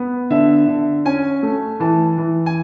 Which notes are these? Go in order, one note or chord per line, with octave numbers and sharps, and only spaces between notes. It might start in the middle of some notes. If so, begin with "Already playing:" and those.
Already playing: B3
D3 E5
D3
C#4 G#5
A3
E3 A5
E3
G#5